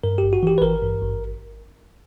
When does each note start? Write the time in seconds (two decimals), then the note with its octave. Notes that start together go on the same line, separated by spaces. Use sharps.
0.04 G2 A#4
0.18 G#1 G4
0.33 F#4
0.43 E3 G4
0.58 B4
0.61 G#1 A#4
0.82 G2
1.02 G#1